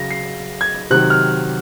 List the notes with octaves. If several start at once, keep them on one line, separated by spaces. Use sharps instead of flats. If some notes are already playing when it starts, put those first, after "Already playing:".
Already playing: C#3 F#3 A#6
C7
G#6
C3 D#3 F#3 F#6
F6